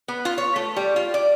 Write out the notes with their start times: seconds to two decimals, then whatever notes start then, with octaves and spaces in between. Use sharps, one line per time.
0.08 B3
0.25 F4
0.38 C#5
0.56 A3
0.76 G3
0.96 F4
1.14 D5